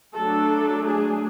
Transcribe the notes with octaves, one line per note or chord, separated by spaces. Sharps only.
F#3 A3 D4 A4
G#4